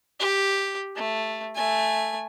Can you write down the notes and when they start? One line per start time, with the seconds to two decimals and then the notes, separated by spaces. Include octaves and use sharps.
0.20 G4
0.96 A3
1.55 A3 G#5